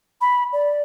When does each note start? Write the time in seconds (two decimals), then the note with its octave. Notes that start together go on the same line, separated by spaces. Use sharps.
0.21 B5
0.53 D5